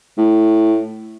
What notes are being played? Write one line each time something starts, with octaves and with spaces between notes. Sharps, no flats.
A2